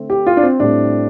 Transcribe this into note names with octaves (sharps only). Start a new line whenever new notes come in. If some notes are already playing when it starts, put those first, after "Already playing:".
Already playing: D3 A3 C4
G4
F4
D4
C4
A2 G3 C4 D4